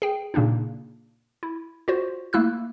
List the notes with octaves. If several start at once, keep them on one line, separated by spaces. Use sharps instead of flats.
G#4 G5
A#2 C#3 A#3 D4 D#4
E4
F4 F#4 C5
A3 A#3 E4 E6 F#6